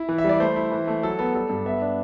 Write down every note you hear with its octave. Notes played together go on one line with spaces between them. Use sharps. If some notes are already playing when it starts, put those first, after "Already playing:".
Already playing: E4
E3
E5
G3 D5
A3 C5
E4
E3
A3
F#3 A4
B3 A4
G3 A4
G2
B3 E5
D4